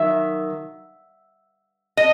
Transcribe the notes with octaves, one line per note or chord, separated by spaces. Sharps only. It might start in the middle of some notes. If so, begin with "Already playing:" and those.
Already playing: D#3 F#3 E5
D#5